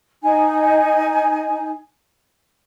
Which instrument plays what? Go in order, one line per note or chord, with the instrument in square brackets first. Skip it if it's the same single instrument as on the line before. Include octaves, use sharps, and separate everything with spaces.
[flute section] D#4 G#5